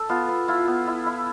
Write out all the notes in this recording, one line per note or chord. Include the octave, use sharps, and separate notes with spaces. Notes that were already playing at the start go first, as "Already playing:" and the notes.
Already playing: A4
B3 F4
B3
E4 F4
B3
E4
E4